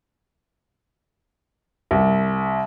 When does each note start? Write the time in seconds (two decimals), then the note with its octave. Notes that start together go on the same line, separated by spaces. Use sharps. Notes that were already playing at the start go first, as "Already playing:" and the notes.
1.91 C2